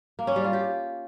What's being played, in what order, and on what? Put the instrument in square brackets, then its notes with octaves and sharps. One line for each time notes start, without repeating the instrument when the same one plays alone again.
[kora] A#3
C#4
G3
F4
G4